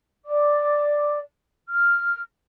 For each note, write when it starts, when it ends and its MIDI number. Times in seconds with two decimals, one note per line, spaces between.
0.26 1.19 74
0.26 1.19 86
1.69 2.21 89